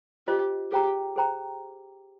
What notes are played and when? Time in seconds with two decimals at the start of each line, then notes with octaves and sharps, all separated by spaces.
0.27 F4 G4 C5 D#5
0.72 G4 G#4 C5 G5 A#5
1.16 G#4 C5 G5 A#5